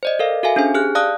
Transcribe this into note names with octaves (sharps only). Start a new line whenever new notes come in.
C5 D5 D#5
A4 A#4 F5
F#4 A4 E5 F5 G#5
C#4 D4 G#4 C5 G#5
G4 G#4 F6 F#6
D5 F5 A5 D#6 F#6